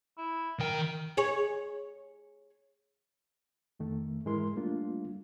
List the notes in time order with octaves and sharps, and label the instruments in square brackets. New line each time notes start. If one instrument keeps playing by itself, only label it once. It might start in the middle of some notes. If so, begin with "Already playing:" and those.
[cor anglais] E4
[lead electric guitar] D#3 G5 [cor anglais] A#4
[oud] G#4 C#5
[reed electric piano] F2 D#3 A3
G#2 E3 G#3 E4 A#4 C6
G3 A3 A#3 D4 F4